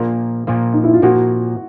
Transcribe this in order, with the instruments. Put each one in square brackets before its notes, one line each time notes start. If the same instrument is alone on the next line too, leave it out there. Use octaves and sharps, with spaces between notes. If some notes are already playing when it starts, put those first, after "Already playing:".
Already playing: [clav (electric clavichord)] A#2 F3 A#3
A#2 F3 A#3
[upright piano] D#4
E4
F4
[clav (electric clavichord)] A#2 F3 A#3 [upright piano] F#4